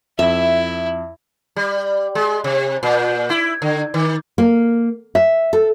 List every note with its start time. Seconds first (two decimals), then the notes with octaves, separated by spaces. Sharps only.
0.19 F2 E4 E5
1.56 G3
2.15 G#3
2.44 C3
2.83 A#2
3.30 E4
3.62 D3
3.94 D#3
4.38 A#3
5.15 E5
5.53 A4